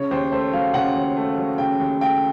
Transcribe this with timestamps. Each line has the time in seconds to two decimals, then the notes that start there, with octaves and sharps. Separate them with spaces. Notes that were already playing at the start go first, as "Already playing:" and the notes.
Already playing: C#3 C#5
0.11 D#2 C5
0.32 A3 C5
0.53 F#3 F5
0.74 C#3 F#5
0.95 D#2
1.17 A3
1.38 F#3
1.58 C#3 G5
1.80 D#2
2.01 A3 G5